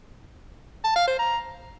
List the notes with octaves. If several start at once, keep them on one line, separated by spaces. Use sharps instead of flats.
A5
F5
C5
A#5